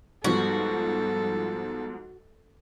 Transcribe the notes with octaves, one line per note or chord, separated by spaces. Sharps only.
G#2 F3 G3 B3 F#4 A4